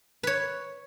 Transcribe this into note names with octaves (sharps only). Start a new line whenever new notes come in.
B4 C#5